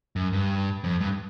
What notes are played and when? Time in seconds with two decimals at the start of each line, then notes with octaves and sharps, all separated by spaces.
0.16 F#2
0.33 G2
0.84 F2
1.00 G2